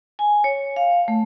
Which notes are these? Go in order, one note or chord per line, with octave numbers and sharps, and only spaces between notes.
G#5
C#5
F5
A3